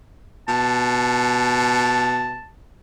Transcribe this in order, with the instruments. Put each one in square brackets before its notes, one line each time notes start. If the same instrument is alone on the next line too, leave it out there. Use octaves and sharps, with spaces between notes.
[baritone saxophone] B2 [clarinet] A5